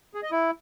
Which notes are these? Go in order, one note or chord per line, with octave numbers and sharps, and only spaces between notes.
G#4
D#5
E4